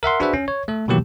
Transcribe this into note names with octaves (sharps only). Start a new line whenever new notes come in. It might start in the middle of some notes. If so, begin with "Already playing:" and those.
A#4 E5 F#5 C6
D4 F#4 G#4 B4 C5 E5
C#4
C#5
A3 A4
B2 D#3 E3 F#3 A#3 G4